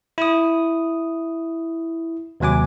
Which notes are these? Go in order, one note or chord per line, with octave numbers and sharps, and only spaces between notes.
E4 D#6
D#2 C3 F#3 G#5 D6